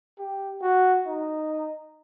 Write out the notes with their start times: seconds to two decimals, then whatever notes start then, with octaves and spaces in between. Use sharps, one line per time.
0.19 G4
0.62 F#4
1.06 D#4